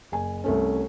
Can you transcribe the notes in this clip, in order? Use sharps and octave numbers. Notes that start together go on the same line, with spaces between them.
F#1 G#5
C2 A3 C#4